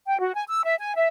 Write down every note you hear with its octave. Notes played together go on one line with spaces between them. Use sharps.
G5
F#4
G#5
E6
E5
G#5
E5